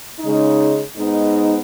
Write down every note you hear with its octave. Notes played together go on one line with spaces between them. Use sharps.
C#3 G#3 D#4
G#2 G#3 B3 D#4